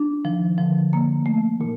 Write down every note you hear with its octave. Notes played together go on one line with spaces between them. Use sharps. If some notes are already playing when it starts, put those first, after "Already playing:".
Already playing: D4
D#3 F3
D3 F3
A#3
A3
A#2 D#3